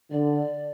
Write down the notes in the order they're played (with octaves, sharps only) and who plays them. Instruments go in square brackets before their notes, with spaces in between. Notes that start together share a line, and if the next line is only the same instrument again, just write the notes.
[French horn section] D3 [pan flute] D5